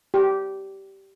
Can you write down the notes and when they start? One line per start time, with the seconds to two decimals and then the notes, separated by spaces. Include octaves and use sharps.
0.14 G4